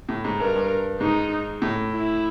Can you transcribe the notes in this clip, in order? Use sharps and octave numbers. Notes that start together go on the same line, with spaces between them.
A2
G#2
G2 A#4
G2
G#2 D#4
A2
E4